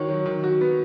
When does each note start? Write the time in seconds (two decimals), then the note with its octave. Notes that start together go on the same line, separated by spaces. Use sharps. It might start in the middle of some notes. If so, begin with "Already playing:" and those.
Already playing: D#3 F#4 C#5
0.08 F#3
0.26 D#3
0.44 F#4
0.61 B3